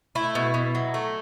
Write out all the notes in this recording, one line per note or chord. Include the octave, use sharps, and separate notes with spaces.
A3 E4
B2
B2
F#3
A3